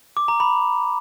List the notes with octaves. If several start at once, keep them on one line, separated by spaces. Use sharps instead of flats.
D6
A#5
B5